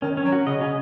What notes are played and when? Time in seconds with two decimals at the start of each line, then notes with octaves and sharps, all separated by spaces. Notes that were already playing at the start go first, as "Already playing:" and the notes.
0.02 D#3 C#4
0.17 C#4
0.25 F#3
0.32 F#4
0.47 C#3 D#5
0.61 C#3 C#4